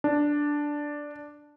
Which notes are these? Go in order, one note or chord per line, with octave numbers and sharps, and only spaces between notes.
D4